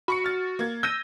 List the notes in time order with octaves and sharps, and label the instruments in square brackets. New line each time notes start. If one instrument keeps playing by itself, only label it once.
[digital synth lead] F#4 [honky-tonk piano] B5 C#6 C#7
[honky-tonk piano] F6 A6
A#3 G#6
[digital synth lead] E6 [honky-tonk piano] G6 A#6 D#7